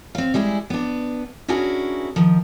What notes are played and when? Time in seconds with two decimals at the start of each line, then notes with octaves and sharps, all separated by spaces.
0.15 C4 F5
0.34 G3 G#3 E4 G#4
0.70 B3 D4
1.48 C#4 D4 E4 F#4 G#4 A#4
2.16 D#3 F3